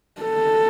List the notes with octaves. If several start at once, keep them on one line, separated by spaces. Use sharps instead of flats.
A4